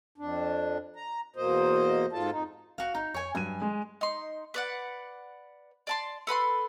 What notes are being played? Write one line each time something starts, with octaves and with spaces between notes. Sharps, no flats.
F2 D4
A#5
E2 B2 A#3 C5 D#5
G#2 F4 A4 A5
F2 D#4
F1 F#4 F5
G1 D#4
F2 C#5 G#5
G2 F#3 G#5 D#7
G#3
D#4 C6
B4 D5 F#5
D5 A5 C6
A4 B4 B5 C6